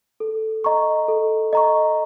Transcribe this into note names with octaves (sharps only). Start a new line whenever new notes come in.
A4
D#5 A#5 C#6
A4
D#5 A#5 C#6